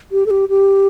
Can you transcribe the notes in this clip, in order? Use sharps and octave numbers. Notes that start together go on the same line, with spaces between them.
G4
A4
G4
G4